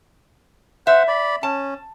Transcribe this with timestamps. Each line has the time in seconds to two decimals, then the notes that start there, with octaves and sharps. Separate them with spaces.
0.87 C5 E5 F#5
1.08 D5 B5
1.43 C#4 A5